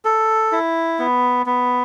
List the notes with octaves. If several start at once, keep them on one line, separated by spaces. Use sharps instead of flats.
A4
E4
B3
B3